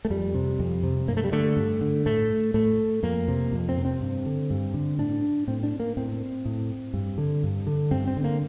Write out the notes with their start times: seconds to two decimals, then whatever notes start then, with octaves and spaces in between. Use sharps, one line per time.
0.05 A3
0.10 F2 G3
0.35 C3
0.59 F2
0.83 C3
1.08 G2 A#3
1.17 A3
1.24 G3
1.32 D3 A3
1.57 G2
1.81 D3
2.06 A2 A3
2.54 A2 A3
3.03 F2 A#3
3.28 C3
3.52 F2
3.69 C4
3.77 C3
3.85 C4
4.01 G2
4.26 D3
4.50 G2
4.74 D3
4.99 A2 D4
5.47 A2 C4
5.63 D4
5.80 A#3
5.97 A2 C4
6.45 A2
6.94 G2
7.18 D3
7.43 G2
7.67 D3
7.91 G2 C4
8.07 C4
8.17 D3
8.24 A#3